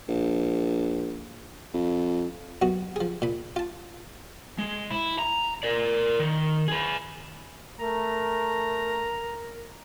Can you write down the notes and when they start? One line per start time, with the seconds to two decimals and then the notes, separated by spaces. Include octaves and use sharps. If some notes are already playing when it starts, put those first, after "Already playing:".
0.08 A#1
1.74 F2
2.62 F#2 B3 F#4
2.96 F3 G#4
3.22 A#2 B5
3.56 F4 A5
4.58 G#3
4.91 E4
5.19 A#5
5.63 A#4 D5
6.20 D#3
6.68 G#4 B4
7.79 A3 A#4 A#5